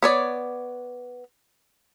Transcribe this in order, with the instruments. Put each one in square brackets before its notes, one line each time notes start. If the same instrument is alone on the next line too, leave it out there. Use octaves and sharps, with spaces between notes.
[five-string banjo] B3 C#5 D5